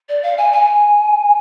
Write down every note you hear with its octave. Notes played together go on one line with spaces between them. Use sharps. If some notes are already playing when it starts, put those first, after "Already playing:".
D5
F5
G#5
G#5